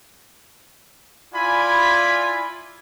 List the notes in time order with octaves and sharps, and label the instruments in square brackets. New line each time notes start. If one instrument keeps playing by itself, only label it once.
[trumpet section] E4 F4 D5 G#5 B5